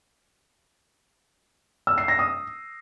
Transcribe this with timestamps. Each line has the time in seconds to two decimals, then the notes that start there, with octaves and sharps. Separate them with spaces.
1.87 E6
1.98 C7
2.08 A#6
2.19 D#6